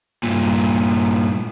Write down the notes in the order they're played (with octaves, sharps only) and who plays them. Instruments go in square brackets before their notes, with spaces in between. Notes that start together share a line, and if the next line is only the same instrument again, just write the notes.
[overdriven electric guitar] G2 A#2